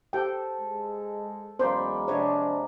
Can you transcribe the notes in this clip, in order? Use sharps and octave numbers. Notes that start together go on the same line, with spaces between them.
G4 A4 C5 G5
G#3
E2 F#3 G#3 A#3 C#4 C5 D5 B5
C3 F3 G#3 C4 D4 G4 C#5